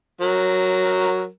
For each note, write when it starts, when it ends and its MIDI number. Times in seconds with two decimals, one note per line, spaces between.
0.21 1.28 54
0.21 1.28 70